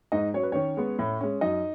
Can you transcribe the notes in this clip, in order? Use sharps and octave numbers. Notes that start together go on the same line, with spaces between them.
G#2 D#4 D#5
F#3 C#4 C#5
B4
D#3 C#4 C#5
G#3 B3
A2
G#3 C#4
F#2 D#4 D#5